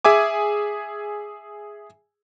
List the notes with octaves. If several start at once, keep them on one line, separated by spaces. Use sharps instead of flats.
G#4 E5 G#5 D6